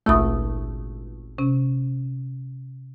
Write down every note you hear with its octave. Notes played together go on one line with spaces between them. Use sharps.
G#1 C#2 A#2 A3 E5 D#6
C3 C#4